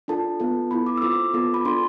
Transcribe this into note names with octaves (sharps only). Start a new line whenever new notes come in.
D4 F4 A4 A5
B3 F4 A4
B3 E4 A4 B5
D6
E6
C4 F4 A4 D6
B3 F4 A4
B5
D4 F4 A4 C6